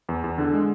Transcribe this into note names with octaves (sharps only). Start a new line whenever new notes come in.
E2
E2
D3
G#3